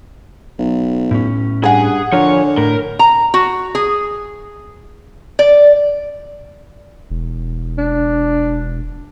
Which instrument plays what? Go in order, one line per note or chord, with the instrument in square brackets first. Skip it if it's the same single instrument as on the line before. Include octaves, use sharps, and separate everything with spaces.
[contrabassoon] B1
[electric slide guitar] A2 C#4
[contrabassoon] G2 [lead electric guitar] G#4 [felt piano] F#5 G#5
[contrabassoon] D3 [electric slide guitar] F3 F4 A#4 [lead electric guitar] C#5
[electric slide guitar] A2 [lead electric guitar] A#4
[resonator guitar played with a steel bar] A#5
F#4
G#4
D5
[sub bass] E1
[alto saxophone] D4